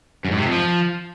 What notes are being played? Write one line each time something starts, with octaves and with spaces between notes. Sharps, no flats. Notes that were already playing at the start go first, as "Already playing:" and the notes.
F#2
G#2
C3
F2
F3